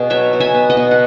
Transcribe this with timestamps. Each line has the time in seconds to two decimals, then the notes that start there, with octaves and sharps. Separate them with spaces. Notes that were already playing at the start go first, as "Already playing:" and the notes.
Already playing: B2 B3 G#4
0.10 F#3 C#5 E5
0.33 B2
0.40 E5 G#5
0.55 B3
0.70 D#5 F#5
0.77 B2
0.91 F#5